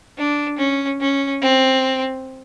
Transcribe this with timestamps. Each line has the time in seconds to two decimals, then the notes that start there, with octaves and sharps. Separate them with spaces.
0.18 D4
0.58 C#4
1.00 C#4
1.42 C4